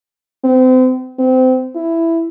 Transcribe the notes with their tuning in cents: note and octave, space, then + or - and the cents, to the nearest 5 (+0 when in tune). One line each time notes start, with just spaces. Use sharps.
C4 -35
C4 -25
E4 +5